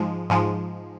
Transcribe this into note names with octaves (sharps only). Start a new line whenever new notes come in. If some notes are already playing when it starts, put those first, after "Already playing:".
Already playing: G#2 F3 G#3
G#2 F3 G#3